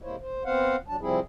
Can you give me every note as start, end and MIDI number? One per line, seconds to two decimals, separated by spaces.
0.02 0.16 48
0.02 0.16 56
0.02 0.16 58
0.02 0.16 64
0.02 0.16 72
0.02 0.16 73
0.20 0.44 72
0.45 0.76 59
0.45 0.76 60
0.45 0.76 72
0.45 0.76 77
0.45 0.76 78
0.88 0.96 54
0.88 0.96 62
0.88 0.96 81
1.01 1.20 48
1.01 1.20 53
1.01 1.20 55
1.01 1.20 60
1.01 1.20 64
1.01 1.20 68